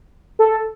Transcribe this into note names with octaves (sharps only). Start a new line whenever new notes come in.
A4